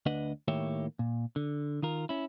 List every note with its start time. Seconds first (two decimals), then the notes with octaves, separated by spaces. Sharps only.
0.06 D2 D4 B4 D#5 F#5
0.48 A2 D#3 A#3 G4 C#5 E5
0.99 A#2
1.36 D3
1.82 D#3 F4 A#4
2.09 C#4 E4